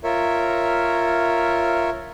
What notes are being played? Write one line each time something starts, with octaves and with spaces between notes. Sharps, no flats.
F4 A#4 C#5 E5